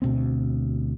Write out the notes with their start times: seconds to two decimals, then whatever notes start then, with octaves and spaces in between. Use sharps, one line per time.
0.02 D2 B2 B3 C4